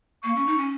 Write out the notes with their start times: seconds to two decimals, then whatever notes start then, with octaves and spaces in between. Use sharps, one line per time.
0.23 A#3 C#6
0.35 C#4
0.47 D#4
0.58 C#4